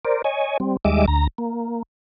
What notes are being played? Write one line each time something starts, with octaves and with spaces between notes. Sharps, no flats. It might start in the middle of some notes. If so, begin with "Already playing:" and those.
A#4 C5 D5
C#5 D#5 G#5
G3 C4
D#2 G3 G#3 D#5 E5 D6
D2 A#5
A#3